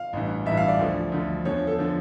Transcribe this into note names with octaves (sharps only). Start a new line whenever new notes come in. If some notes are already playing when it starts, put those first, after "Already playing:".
Already playing: F5
A1 G2 E3
A1 G2 E3 E5
F5
D5
D2 D3 F3
D2 D3 F3
E2 D3 F3 C#5
A4
D3 F3